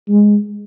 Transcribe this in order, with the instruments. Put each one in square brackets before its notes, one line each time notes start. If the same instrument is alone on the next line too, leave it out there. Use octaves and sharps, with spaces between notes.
[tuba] G#3